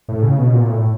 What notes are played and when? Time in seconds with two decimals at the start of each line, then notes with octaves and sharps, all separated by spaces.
0.08 A2
0.23 C#3
0.38 B2
0.53 A#2
0.68 A2